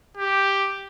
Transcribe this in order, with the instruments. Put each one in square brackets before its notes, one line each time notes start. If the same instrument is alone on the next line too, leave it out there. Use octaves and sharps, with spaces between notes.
[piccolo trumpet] G4